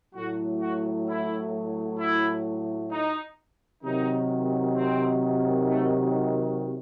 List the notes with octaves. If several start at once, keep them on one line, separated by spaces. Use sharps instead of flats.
A2 F#3 F#4
F#4
E4
E4
D#4
C3 D#3 F#3 D#4
C4
A3